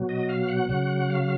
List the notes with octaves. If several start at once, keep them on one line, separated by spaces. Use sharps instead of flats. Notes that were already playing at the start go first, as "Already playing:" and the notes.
Already playing: B2 F#3
D#5
F5
F#5
C#3 F#3 F#5
F5